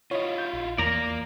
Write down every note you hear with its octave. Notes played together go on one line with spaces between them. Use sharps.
E4 F4 C#5 D#5
G6
A#1
E2 A#3 D5 A#5